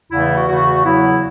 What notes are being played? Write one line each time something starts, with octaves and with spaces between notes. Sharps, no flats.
E2 C#3 E3 A3 E4
E4
F#4
E2 C#3 E3 A3 F#4
E2 C#3 F#3 B3 E4